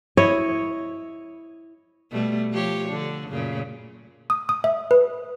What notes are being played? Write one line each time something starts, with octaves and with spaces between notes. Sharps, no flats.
E4 C#5 D#5
B2 G3 A3
F3 G4 C#5
D3 D4
F#2 A#2 C#3
D#6
D#6
E5
B4